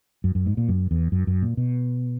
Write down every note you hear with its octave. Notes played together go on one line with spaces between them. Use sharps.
F#2
F#2
G#2
A#2
F#2
E2
F#2
F#2
A#2
B2